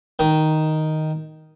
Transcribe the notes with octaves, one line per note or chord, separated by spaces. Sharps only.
D#3